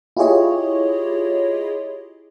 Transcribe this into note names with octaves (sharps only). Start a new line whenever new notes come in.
E4 F4 G4 G#4 C#5 D#5